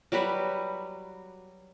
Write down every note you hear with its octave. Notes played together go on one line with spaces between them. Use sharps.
F#3 G3 F#4 B4